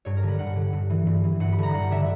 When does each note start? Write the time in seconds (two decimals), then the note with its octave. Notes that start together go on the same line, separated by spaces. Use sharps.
0.05 G2 C#5
0.17 A#4
0.23 D3
0.28 B4
0.39 G2 F#5
0.56 D3
0.73 G2
0.90 E3
1.06 G2
1.24 E3
1.40 G2 F#5
1.52 B5
1.58 D3 A#5
1.74 G2 F#5
1.91 D3 E5